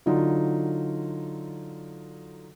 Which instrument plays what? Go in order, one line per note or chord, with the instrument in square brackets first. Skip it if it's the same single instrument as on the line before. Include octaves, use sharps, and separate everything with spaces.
[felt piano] D3 F#3 D#4 F4